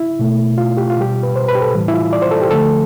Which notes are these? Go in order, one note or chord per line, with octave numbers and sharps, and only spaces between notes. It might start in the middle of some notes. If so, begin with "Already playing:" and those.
Already playing: E4
B2 A3
F4
G4
F4
B2 G3 G4
B4
C5
B4
G4
A4
A2 E3 G3
E4
F4
D5
C5
A4
G4
D3 F3 A3 A4